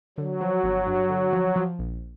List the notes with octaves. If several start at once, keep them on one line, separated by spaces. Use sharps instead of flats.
D3 F#3
F3
G1
G2
D3
F3
F3
A#1